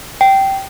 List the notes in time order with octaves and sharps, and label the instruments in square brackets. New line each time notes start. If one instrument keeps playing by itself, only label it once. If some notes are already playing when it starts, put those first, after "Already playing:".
[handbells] G5